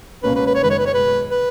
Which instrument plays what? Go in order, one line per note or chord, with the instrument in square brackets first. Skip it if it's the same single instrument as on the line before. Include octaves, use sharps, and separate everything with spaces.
[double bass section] C#2 B2 A#3 C#4 [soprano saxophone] B4
[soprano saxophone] B4
B4
C#5
[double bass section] F#1 F#2 D#3 G#3 [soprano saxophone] B4
[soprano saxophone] C#5
B4
C#5
[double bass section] B1 B2 G#3 [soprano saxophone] B4
[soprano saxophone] B4